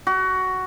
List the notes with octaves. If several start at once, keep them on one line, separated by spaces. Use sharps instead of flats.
F#4